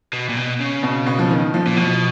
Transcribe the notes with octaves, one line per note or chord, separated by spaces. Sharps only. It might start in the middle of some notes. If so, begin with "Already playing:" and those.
B2
A#2
B2
C#3
B2
B2
F3
D#3
F3
A#2
B2 F3